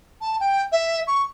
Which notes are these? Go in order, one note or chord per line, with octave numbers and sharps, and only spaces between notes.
A5
G5
E5
C#6